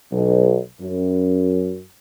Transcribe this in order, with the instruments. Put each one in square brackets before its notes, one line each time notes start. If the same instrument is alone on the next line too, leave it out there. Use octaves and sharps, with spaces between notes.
[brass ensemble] B1
F#2